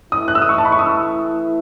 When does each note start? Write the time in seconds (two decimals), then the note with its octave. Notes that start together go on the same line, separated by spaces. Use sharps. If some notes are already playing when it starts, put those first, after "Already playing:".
0.12 E3 A3 E4 D#6
0.28 F#6
0.35 E6
0.42 D#6
0.49 C#6
0.58 A5
0.65 B5
0.72 C#6
0.79 D#6
0.86 E6